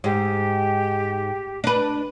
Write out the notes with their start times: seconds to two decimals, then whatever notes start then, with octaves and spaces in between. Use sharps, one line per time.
0.04 G#2 G4
1.64 D4 B4